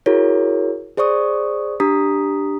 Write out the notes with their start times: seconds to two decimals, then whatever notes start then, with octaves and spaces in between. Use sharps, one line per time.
0.06 E4 F#4 G#4 A#4 C#5
0.97 G#4 C5 D5 C#6 D#6
1.80 D4 G4 A#5 D#6 B6